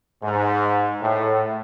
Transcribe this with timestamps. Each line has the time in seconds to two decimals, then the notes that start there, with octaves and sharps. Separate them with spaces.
0.22 G#2
1.01 A2